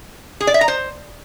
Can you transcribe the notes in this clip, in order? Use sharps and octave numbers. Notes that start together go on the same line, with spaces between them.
G#4
D5
E5
A#5
C5